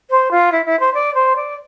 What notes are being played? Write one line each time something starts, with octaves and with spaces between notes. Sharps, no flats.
C5
F4
E4
E4
C5
D5
C5
D5